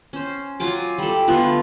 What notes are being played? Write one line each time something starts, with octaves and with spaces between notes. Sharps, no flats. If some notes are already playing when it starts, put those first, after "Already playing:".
C#4 C5
F#3 F4 G#5 D6
G3 A4
D3 A3 B3 F4